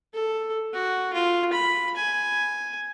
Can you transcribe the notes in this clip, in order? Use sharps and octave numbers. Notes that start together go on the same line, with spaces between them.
A4
F#4
F4
B5
G#5